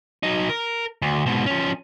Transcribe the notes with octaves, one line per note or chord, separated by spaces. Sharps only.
F#3 D#4
A#4
D2
G#2 B2
F3 C#4